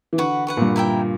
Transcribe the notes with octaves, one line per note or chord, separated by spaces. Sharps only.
E3
D3 F#4 B4 F#5
F#4 B4 F#5
A#2
G2
E4 A#4 E5 G5